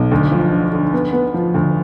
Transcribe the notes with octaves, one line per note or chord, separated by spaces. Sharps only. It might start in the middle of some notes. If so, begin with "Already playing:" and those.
Already playing: B1
D2
F3
D3
D3
B3
B3
F3
D2